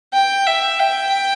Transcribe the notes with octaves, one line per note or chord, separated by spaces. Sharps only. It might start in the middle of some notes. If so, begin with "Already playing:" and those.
G5
E5
G5